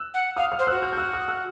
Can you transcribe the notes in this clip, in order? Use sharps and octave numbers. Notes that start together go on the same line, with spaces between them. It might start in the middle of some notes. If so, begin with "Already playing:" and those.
Already playing: E6 F#6
F#5
F5 D#6 F6
D#6 F6
C5
F#4 E6 F#6
F6 G6
G6
E6 F#6
D#6 F6
E6 F#6